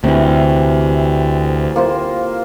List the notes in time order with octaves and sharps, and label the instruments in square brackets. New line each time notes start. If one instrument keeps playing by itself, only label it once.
[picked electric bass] D2 [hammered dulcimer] C3 E3
[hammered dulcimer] A#3 F4 C5